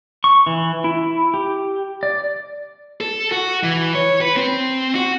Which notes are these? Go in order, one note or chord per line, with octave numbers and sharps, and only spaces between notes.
C#6
E3
E4
G4
D5
A4
F#4
E3
C#5
B4
C4
F#4